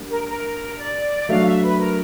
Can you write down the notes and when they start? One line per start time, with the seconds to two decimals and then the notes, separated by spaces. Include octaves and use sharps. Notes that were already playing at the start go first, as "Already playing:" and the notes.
Already playing: G3 A#3 D4
0.10 A#4
0.28 A#4
0.78 D5
1.29 F#3 A3 D4 F#4 F5
1.46 E5
1.63 B4
1.79 A#4